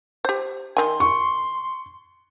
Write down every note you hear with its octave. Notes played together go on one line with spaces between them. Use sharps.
G4 C5
D#3 G#5 C6
C#6